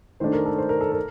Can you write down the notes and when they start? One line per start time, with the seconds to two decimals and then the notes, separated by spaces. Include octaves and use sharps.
0.20 D#3 A3 D4 C5
0.33 A#4
0.46 A4
0.58 C5
0.69 A#4
0.81 A4
0.92 A#4